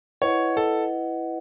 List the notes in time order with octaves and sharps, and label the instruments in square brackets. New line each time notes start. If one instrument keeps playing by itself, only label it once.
[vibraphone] E4 B4 D#5 F#5 [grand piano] C#5
[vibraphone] E4 B4 D#5 F#5 [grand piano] A4